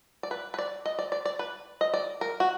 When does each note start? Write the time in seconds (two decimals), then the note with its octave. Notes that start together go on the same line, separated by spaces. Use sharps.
0.23 D5
0.31 B4
0.54 B4
0.58 D5
0.85 D#5
0.99 D5
1.12 D5
1.25 D5
1.39 B4
1.81 D#5
1.93 D5
2.21 A#4
2.40 F#4